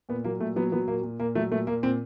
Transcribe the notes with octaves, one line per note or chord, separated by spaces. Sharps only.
A#2 B3
F#3 A#3
A#2 A3
F#3 B3
F#3 B3
A#2 A#3
A#2
A#2 A#3
F#3 A3
A#2 A3
A#2 A#3
A#2 C4